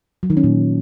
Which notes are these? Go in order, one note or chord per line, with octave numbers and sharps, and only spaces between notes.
F#3
D#3
C#4
A#2